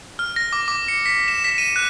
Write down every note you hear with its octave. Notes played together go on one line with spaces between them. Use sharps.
F6
A#6
D6
D6
C#7
B6
E7
B6
D#7
F#6